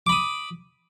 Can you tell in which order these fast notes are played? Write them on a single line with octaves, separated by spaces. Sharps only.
D6 B5 D#6